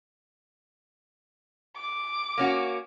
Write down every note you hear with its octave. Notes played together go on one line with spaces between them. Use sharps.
D6
A#3 C#4 F#4